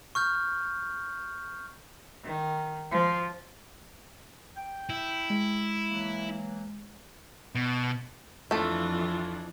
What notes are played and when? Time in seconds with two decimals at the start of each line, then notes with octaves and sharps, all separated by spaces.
0.15 C#6 F6 G6
2.24 D#3
2.91 F3
4.57 G5
4.90 E4
5.30 G#3
5.91 E3 F#3 A#3
7.55 B2
8.51 F2 E3 A3 D4 F4 A4